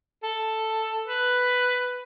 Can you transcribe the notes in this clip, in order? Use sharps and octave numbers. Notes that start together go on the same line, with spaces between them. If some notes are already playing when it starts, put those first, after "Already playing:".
A4
B4